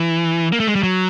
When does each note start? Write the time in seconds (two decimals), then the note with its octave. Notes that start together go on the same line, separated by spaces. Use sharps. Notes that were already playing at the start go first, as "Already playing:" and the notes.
Already playing: E3
0.52 A#3
0.60 A3
0.67 G#3
0.75 G3
0.83 F#3